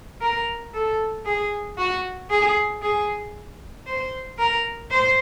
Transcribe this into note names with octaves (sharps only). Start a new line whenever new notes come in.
A#4
A4
G#4
F#4
G#4
G#4
C5
A#4
C5